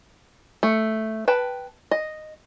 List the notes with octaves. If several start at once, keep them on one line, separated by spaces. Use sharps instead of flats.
A3
B4 G5 A5
D#5